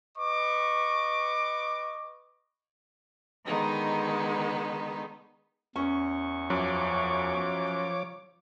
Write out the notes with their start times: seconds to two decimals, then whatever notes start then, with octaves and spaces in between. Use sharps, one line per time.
0.18 B4 D#5 C#6 D6
3.45 D3 D#3 G#3 B3 D#4
5.76 E2 C#4 C#6
6.50 F#2 F3 C#5 D6